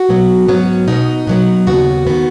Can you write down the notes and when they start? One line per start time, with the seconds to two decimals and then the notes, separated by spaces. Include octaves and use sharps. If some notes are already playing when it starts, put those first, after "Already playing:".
Already playing: F#4
0.09 B2 F#3 B3
0.48 G#2 F#3 B3 C#4
0.88 B2 B3 D#4
1.27 B2 F#3 B3
1.67 D#2 C#3 B3 F#4
2.07 D#3 B3